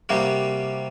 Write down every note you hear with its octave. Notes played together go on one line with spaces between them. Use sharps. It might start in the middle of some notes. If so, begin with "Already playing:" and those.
C3 G3 A#3 F#4